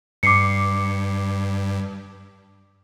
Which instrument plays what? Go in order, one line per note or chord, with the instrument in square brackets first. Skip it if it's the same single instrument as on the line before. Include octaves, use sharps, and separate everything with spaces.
[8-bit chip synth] G2 [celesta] D6 C7 C#7